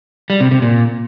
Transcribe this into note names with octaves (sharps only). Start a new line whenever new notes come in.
G3
C3
C3
A#2